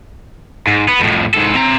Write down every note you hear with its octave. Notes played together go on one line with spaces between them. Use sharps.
G#2
B3
F2 A2
G#2 A4
C4 A#5